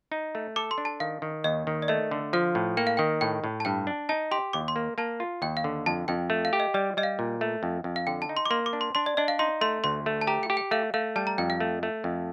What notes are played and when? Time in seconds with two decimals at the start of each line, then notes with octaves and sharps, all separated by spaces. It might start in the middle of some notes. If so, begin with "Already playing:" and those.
0.12 D#4
0.35 A3
0.56 A4 D6
0.71 C6
0.78 D4
0.85 A5
1.00 D#3 F5
1.22 D#3
1.44 D#2 D#5
1.67 D#3
1.82 D5
1.88 A3 D#5
2.11 D3
2.33 F3 F5
2.55 A2
2.77 A#3 G5
2.87 F5
2.97 D#3 G5
3.21 A2 G5
3.44 A2
3.60 A5
3.65 G2 G5
3.87 D4
4.09 D#4 A5
4.31 G4 C6
4.53 D#2 D6
4.68 C6
4.76 A#3
4.98 A#3 A5
5.20 F4
5.42 D#2 G5
5.57 F5
5.64 D3
5.86 F2 A5
6.08 F2 G5
6.30 A3
6.45 F5
6.53 G4
6.60 D#5
6.74 G3 D5
6.97 G3 D#5
7.03 F5
7.19 A#2
7.41 A3
7.63 F2
7.84 F2
7.96 F5
8.07 D3 G5
8.22 A5
8.29 D#4
8.37 C6
8.45 D6
8.50 A#3 C6
8.66 D6
8.73 D4
8.81 C6
8.95 D4 C6
9.06 D5
9.17 D4 D#5
9.28 F5
9.39 D#4 C6
9.61 A3 C6
9.84 D2 C6
10.06 A3
10.21 A5
10.27 G4 A#5
10.43 G5
10.50 G4
10.57 G5
10.71 A3 F5
10.94 A3 F5
11.16 G3 A5
11.27 A#5
11.38 F2 G5
11.50 F5
11.60 A3
11.83 A3
12.04 F2